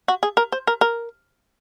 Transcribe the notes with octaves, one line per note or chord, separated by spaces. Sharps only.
F#4
G#4
A#4
C5
A#4
A#4